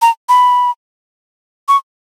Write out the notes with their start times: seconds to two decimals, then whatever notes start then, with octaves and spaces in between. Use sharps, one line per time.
0.02 A#5
0.29 B5
1.68 C#6